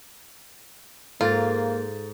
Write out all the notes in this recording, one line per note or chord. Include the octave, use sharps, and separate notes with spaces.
G#2 A#3 F4 A4 A6